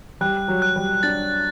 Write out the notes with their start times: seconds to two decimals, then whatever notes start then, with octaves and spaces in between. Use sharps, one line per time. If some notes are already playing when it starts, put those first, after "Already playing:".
0.21 G3 F#6
0.48 F#3
0.62 F#6
0.76 G3
1.03 D4 A6